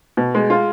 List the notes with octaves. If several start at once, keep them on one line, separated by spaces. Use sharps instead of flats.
B2
G#3
F4